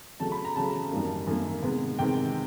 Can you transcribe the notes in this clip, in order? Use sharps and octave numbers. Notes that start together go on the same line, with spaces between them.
C#3 F#3 A3 A5
B5
A#5
C#3 F#3 A3 A5
F#2 D#3 G3 A#3
F#2 D#3 G3 A#3
C3 D#3 G#3 B3
C3 D#3 G#3 B3 G5